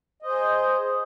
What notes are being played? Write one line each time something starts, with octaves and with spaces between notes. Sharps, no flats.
G#4 C5 D#5